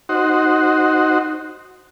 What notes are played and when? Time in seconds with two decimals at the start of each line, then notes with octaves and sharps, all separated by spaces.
0.09 D#4 F#4 C5